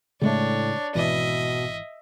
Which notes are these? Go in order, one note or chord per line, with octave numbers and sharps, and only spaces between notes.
A2 C#3 G#3 A3 D4 C#5
G#1 B2 E3 D#5 E5